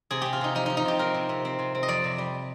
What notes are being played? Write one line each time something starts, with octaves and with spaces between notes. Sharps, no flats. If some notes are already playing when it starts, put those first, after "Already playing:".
C3 G#4
C3 G4
F4
C3 D#4
F3 D#4
F3 D#4
D#4
C3 G4
C4 A#4
C3
C3
C4
C3
C4
D#5
F2 D5
C3
G3